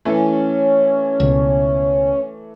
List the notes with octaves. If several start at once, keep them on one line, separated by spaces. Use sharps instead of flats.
E3 A3 C#4
C#2 B2